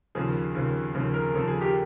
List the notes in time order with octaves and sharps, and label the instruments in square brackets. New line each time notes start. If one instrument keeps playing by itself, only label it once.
[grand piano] D#2 C#3 F3 G#4
D#2 C#3 F3
D#2 C#3 F3
A#4
D#2 C#3 F3 A4
G#4
G4